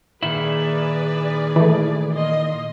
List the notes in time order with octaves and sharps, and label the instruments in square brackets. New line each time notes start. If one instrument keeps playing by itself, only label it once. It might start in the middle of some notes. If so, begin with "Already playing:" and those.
[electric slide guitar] A#2 D#3 E4 [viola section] G#4 B4 D5
[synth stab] E3 A3
[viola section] A#3 D#5 C6